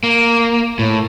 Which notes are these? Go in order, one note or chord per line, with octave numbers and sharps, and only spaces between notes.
A#3
A2